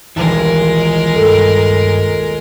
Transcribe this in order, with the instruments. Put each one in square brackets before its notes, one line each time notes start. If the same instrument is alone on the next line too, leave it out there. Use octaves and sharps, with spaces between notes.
[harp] D#1 B1 G3 [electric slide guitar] E3 [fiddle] G#3 A#4
[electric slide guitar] G2 [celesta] A4